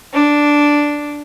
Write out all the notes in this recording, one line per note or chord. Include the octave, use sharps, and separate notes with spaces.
D4